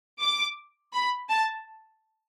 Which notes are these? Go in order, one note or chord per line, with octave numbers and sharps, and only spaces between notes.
D6
B5
A5